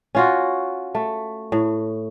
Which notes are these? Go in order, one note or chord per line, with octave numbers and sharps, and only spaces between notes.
C#4 F4 F#4
A3
A2